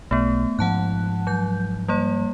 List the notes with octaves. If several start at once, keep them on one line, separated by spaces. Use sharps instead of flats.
B1 A3 B3
G#2 F3 F#5 A5 F#6
F#3 G6
G3 A#3 C#5